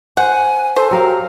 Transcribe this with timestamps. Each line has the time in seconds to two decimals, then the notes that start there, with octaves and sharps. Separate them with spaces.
0.17 C5 F#5 G#5
0.76 A4 C5
0.91 F#3 G4 A#4 F5